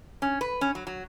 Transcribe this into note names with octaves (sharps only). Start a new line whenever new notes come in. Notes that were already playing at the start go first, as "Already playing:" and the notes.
C#4
B4
C#4
F#3
F#3